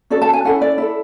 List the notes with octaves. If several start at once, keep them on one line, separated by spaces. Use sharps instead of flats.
C#4 F#4 A4 D5
A5
G#5
C#4 E4 A4 F#5
D5
E4 A4